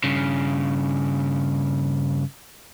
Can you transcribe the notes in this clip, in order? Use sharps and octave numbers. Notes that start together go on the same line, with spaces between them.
G2 C#3